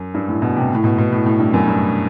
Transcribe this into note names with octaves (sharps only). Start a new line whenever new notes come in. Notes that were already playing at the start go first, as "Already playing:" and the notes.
Already playing: F#2
G2
A2
B2
C3
A2
B2
B2
A2
A2
G2
F#2
G2